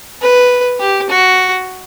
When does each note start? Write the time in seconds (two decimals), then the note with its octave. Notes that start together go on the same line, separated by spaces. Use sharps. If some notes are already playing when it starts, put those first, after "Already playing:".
0.21 B4
0.80 G4
1.10 F#4